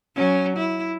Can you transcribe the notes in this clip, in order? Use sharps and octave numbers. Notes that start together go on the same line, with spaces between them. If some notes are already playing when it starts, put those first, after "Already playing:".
F#3 C#4
E4